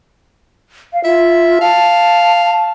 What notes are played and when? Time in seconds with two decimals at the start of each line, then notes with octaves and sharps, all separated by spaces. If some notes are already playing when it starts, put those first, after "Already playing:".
0.93 F5
1.04 F4 E5
1.61 F5 A5